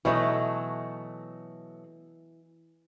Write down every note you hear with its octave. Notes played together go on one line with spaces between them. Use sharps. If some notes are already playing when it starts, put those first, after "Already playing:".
B2 E3 F#3 A3 B4 D#5 E5